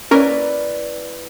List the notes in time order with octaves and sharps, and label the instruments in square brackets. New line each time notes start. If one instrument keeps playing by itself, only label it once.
[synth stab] A#3 C#4 A#4 [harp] E4 B4 D5